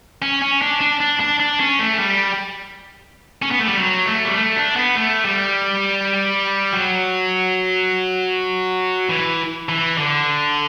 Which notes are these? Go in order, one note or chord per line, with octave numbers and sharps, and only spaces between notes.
C#4
C#4
D4
D4
D4
D4
D4
C#4
A3
G3
C#4
B3
A3
G3
F#3
A3
G3
A3
D4
B3
A3
G3
F#3
E3
E3
D3